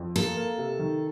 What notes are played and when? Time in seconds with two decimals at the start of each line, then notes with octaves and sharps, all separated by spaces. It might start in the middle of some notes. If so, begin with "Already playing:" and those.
Already playing: F2
0.15 A#3 A4
0.37 A#3
0.58 C3
0.79 D#3